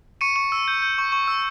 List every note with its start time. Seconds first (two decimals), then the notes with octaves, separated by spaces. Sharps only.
0.21 C#6 C#7 D#7
0.36 C#6
0.52 E6
0.68 G6
0.82 G6
0.98 C#6
1.12 C#6
1.28 E6